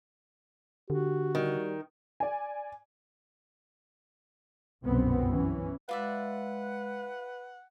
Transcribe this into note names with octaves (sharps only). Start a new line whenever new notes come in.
D3 F#4 G4
D#3 G3
D5 G#5
G1 C2 F#2 B2 B3 C4
E3 C#4
G#3 F4 B4 D5 E5 F#5